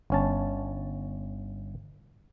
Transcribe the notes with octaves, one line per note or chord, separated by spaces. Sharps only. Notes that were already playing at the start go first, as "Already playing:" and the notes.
G1 C#4 A5